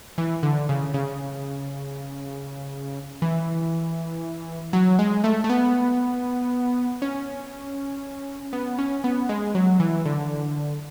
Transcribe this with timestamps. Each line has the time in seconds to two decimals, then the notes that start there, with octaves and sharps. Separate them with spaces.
0.18 E3
0.43 D3
0.69 C#3
0.94 C#3
3.22 E3
4.73 F#3
4.99 G#3
5.24 A3
5.44 A3
5.50 B3
7.02 C#4
8.53 B3
8.79 C#4
9.04 B3
9.29 G#3
9.55 F#3
9.80 E3
10.05 D3